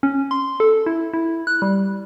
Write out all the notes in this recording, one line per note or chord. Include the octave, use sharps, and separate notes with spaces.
C#4
C6
A4
E4
E4
F#6
G3